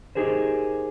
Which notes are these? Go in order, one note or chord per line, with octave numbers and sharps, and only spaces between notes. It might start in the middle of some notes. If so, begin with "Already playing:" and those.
D#4 G4 G#4 A#4 C5